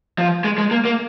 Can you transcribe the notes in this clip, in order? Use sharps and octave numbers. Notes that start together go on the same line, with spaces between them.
F3
G#3
G#3
A#3
A#3